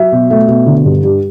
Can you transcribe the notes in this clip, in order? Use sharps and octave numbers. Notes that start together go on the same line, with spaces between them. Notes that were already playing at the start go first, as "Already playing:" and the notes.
Already playing: F#3 E5
B2
A3
B2
D3
G2
G3